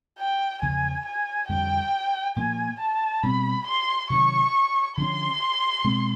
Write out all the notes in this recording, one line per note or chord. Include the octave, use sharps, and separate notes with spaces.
G5
E2 C#3 F3 G#5
G#5
F2 D3 G3 G5
A#2 F3 A#3 G#5
A5
B2 G3 C4 B5
C6
C3 D#3 F#3 C#6
D3 F3 G#3 C#4 C6
B2 G#3 C4